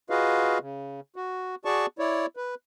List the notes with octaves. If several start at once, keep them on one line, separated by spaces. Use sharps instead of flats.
F4 F#4 G#4 B4 D#5 F5
C#3
F#4
F#4 G#4 D5 A5 C#6
E4 C#5 D5
B4